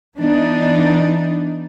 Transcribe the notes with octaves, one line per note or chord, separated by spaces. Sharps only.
E3 B3 D4 D#4